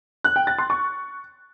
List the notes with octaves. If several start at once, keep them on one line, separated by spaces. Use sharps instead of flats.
F#6
G5
A6
C6
C#6